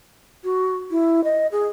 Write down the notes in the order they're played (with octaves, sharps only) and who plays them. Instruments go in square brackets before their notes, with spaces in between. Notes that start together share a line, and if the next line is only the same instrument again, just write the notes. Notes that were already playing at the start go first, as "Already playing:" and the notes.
[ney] F#4
E4
D#5
G#4